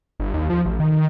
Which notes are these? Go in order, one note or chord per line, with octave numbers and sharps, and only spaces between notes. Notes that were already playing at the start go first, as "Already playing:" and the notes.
G1
D#2
F3
A1
D#3
D#3